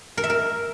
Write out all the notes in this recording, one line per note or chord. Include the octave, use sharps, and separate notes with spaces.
A#4
E5
A#4